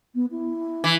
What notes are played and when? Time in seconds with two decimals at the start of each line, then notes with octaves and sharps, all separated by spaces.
0.15 B3
0.31 E4
0.84 E3